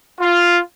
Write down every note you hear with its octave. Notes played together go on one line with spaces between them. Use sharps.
F4